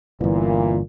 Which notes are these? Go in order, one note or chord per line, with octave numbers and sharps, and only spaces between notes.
D1 G1 A#2 E3